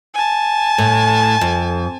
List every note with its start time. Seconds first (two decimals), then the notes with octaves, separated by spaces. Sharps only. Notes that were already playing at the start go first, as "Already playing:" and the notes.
0.14 G#5 A5
0.78 A2
1.41 F2